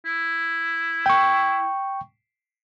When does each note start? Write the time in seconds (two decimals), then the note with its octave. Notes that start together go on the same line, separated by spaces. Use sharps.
0.06 E4
1.06 G5 C#6